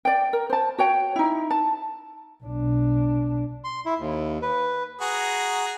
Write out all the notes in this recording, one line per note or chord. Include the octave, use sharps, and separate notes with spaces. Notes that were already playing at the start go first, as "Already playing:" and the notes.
D5 G5
A#4
C5 A5
F#4 C#5 G5
D#4 E4
A5
B1 D4
C6
E4
D#2
B4
F#4 G#4 A#5